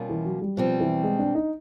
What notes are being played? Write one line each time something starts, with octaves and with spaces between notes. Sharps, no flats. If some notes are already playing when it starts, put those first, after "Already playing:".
Already playing: B2 G3 A#3 C#4 F4
E3
F#3
G3
B2 F3 G3 C4
E3
G#3
D4
D#4